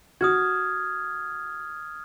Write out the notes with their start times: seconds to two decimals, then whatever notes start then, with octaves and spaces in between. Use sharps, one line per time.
0.21 F#4 D#6 F6 G#6